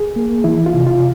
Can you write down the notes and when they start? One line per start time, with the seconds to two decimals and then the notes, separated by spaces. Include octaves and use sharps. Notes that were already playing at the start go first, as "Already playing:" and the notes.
Already playing: G#4
0.16 A#3
0.44 E3 E4
0.66 F4
0.73 C3
0.86 F4